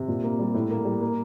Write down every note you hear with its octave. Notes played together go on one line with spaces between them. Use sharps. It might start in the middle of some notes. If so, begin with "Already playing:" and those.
Already playing: C3
A#2
A#3
G3
A2
A#3
G3
A#3